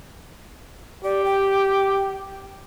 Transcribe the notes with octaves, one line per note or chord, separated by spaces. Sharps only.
G4 D5
G5